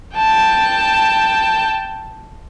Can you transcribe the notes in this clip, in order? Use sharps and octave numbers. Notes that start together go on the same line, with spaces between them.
G5 A5